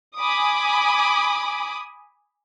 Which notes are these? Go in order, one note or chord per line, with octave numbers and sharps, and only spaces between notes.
G#5 B5 D6 D#6